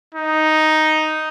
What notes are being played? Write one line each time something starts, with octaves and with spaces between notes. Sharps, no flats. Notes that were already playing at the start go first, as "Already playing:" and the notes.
D#4